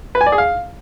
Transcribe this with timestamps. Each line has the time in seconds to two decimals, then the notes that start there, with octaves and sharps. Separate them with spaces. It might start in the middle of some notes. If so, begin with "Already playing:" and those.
0.15 B4
0.21 G#5
0.26 D5
0.32 G#4
0.38 F5